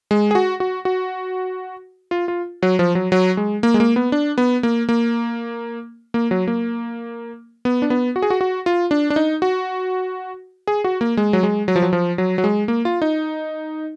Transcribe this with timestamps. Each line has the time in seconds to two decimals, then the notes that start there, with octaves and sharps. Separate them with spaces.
0.11 G#3
0.31 G#4
0.35 F#4
0.60 F#4
0.85 F#4
2.11 F4
2.28 F4
2.63 F#3
2.79 F3
2.95 F#3
3.12 F#3
3.37 G#3
3.63 A#3
3.74 G#3
3.80 A#3
3.96 B3
4.12 D4
4.38 B3
4.63 A#3
4.89 A#3
6.14 A#3
6.31 F#3
6.48 A#3
7.65 B3
7.82 D4
7.90 B3
8.16 F#4
8.22 G#4
8.30 F#4
8.41 F#4
8.66 F4
8.91 D4
9.10 D4
9.16 D#4
9.42 F#4
10.67 G#4
10.84 F#4
11.01 A#3
11.17 G#3
11.33 F#3
11.43 G#3
11.68 F#3
11.76 F3
11.82 F#3
11.93 F3
12.18 F#3
12.38 F#3
12.44 G#3
12.68 A#3
12.85 F4
13.02 D#4